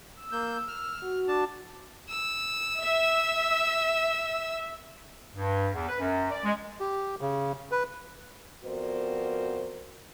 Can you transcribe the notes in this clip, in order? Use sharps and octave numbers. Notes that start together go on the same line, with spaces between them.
E6
A#3 G6
F6
F#4
D4 A5
E6
E5
G2
E2
B4
F#2
D5
G#3
G4
C#3
B4
F2 B3 F#4 A#4 C5 D5